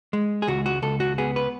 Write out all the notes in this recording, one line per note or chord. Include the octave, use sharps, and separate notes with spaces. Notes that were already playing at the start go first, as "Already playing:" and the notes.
G#3
G#4
C#2 F#4
F#4
C#2 A4
F#4
B3 G#4
B4